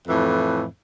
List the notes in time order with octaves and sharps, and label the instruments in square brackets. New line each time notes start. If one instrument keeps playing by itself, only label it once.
[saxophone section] F2 A2 E3